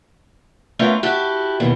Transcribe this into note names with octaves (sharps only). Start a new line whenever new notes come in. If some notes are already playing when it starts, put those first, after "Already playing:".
A3 B3 C#4 F4 A#4
E4 F#4 G4 A4
D#2 B2 E3